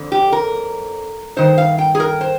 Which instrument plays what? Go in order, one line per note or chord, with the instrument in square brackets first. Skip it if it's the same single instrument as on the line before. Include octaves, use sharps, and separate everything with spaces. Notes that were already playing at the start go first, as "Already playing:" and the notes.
Already playing: [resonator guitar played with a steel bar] F2 D3
G4
A#4
G2 D#3 C5
F5
G5
G#4
A#4
C5